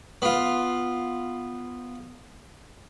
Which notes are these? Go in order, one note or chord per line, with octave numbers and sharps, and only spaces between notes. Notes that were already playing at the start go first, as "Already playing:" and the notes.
B3 F4